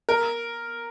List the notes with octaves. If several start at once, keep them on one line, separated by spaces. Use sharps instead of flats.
A#4